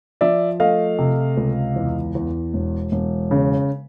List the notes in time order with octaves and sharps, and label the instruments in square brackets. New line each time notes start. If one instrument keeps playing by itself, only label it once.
[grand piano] F3 D5 E5
A3 D#5 F5
C3
C#2
E2
E2
E1
E1
C#3